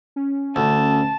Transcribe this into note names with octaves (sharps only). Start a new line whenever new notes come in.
C#4
D2 A5